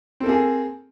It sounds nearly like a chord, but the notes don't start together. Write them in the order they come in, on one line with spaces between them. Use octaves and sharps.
C4 A4 A#3 G#4